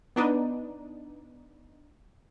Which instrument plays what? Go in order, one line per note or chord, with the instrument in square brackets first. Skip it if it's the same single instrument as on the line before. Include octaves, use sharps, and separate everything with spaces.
[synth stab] B3 D4 D#4